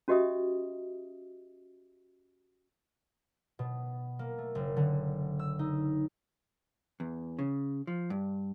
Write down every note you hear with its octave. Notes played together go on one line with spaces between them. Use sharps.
C#4 F#4 G4 D#5 E5 D#6
B2
A#3
A3
F#1
D3
E6
D#4
E2
C#3
F3
G2